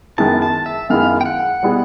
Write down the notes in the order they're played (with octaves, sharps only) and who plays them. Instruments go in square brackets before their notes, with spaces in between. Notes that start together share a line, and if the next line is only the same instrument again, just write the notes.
[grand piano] F#2 D#3 G#3 B3 E4 [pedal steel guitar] A5
[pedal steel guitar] A5
E5
[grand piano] F#2 D#3 G#3 B3 E4 [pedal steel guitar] F5
[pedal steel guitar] G5
F#5
[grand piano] B2 G3 B3 E4 G#4